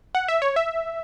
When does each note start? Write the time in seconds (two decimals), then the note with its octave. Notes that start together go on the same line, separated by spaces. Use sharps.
0.15 F#5
0.28 E5
0.42 C#5
0.56 E5